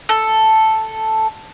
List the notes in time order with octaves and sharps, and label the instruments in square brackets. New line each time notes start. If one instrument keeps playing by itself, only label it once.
[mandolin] A4